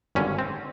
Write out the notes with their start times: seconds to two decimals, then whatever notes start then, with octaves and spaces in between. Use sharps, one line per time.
0.15 G#1 G2 D3 C#4
0.39 C4